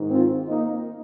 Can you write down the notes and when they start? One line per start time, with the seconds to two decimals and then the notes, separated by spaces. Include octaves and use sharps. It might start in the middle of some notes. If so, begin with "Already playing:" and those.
Already playing: G#2 D#3
0.10 C4 F4
0.49 A#3 D#4